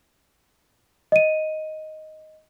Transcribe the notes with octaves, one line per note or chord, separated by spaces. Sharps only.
D#5 D#7